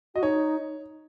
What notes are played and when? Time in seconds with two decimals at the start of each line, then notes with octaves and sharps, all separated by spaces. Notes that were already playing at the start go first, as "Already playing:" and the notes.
0.15 F#4 D#5
0.23 D#4 C#5